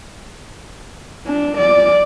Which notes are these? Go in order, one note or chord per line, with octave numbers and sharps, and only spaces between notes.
D4
D5